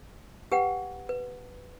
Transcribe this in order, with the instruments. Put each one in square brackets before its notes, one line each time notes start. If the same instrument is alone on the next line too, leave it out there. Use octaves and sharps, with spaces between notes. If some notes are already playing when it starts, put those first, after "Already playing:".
[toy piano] G4 B4 F#5 G5
B4